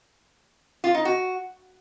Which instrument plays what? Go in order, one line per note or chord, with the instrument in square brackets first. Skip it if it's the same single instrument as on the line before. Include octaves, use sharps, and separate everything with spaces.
[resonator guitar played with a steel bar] F4
D#4
F#4